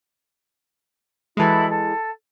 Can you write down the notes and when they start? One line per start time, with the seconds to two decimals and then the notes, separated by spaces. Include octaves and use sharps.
1.37 E3 G#3 E4 F#4 A4
1.69 A4